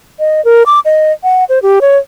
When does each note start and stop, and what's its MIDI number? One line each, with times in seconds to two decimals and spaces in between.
0.19 0.44 75
0.45 0.63 70
0.66 0.80 86
0.85 1.12 75
1.23 1.44 78
1.49 1.59 72
1.63 1.79 67
1.81 1.97 73